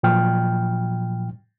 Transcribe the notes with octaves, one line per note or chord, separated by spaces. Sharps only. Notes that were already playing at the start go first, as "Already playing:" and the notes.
A#2 F3 F#3 G5 F6